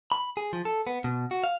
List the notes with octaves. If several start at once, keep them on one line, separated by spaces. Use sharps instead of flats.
B5
G#4
F3
A4
B3
B2
F#4
F5